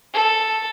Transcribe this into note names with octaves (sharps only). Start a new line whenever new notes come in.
A4